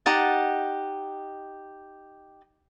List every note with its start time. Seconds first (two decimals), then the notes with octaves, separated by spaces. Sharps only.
0.06 D#4 G4 F#5 A5